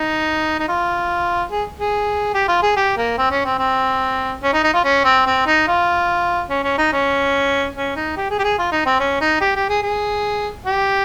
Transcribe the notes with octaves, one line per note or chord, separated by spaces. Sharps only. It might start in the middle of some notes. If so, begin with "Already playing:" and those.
Already playing: D#4
D#4
F4
G#4
G#4
G4
F4
G#4
G4
A#3
C4
C#4
C4
C4
C#4
D#4
D#4
F4
C#4
C4
C4
D#4
F4
C#4
C#4
D#4
C#4
C#4
D#4
G4
G#4
G4
G#4
F4
D#4
C4
C#4
D#4
G4
G4
G#4
G#4
G4